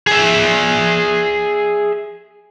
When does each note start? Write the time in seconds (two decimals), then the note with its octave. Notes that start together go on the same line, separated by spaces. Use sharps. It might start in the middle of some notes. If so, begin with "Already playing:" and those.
0.07 G#4 E5